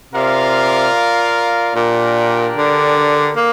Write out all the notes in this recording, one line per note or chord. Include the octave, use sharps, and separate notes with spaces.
C3 F4 A#4 D5 F5
A#2 D4 G4 A#4 D5
D3
A#3